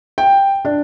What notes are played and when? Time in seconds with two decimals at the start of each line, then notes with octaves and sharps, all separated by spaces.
0.18 G5
0.65 D4